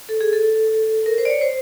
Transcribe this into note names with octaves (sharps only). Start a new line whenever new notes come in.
A4
G#4
A4
A#4
C5
D5
C#5
C5